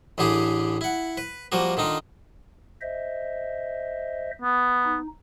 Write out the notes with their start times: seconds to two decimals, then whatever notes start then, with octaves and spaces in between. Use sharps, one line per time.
0.18 A1 D3 E3 G4 G#4
0.81 E4 F#5
1.17 B4
1.52 F3 G3 A#3 F#4
1.77 D3 D#3 D#4 F4
2.81 C5 D#5 E5
4.42 B3
4.84 D#4